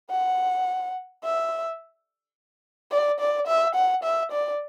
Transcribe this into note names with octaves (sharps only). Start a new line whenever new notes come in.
F#5
E5
D5
D5
E5
F#5
E5
D5